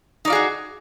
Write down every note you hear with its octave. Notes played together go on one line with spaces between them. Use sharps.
D#4 F4 F#4 G#4 D5